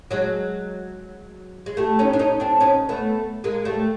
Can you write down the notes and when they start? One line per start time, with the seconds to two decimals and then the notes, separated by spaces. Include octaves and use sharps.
0.11 F#3 G#3
1.66 G#3
1.77 G3 A3
1.99 C#4 D#4
2.13 D4
2.19 C#4 D#4
2.40 C4 D4
2.60 C#4 D#4
2.89 A3 B3
3.44 G#3 A#3
3.65 G3 A3